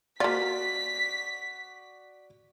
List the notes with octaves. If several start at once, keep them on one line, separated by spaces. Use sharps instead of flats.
A#3 F4 F#4 D5 B6